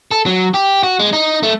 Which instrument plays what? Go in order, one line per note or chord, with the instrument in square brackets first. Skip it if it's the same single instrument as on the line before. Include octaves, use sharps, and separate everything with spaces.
[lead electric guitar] A4
F#3
G4
F#4
G#3
D#4
A3